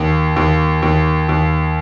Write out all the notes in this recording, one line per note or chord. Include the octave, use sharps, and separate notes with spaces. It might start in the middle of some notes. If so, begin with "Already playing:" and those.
Already playing: D#2
D#2
D#2
D#2